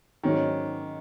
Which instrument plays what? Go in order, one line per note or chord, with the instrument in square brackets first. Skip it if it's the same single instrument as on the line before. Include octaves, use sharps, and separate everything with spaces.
[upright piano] G#2 F#3 C#4 F#4 [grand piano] D#3